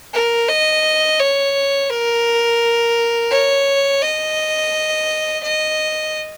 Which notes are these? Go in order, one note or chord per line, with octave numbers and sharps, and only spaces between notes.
A#4
D#5
C#5
A#4
C#5
D#5
D#5